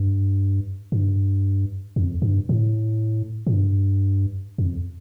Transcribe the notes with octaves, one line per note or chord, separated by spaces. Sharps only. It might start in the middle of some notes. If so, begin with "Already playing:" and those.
Already playing: G2
G2
F2
G2
A2
A2
G2
F2